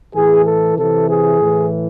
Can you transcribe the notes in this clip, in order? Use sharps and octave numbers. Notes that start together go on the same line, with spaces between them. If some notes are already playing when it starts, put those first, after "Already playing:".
A2 E3 G#4
A4
C3 E3 A4
G#4
A2 E3